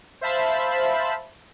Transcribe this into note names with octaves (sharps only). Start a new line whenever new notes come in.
C5 E5 F5 A5 B5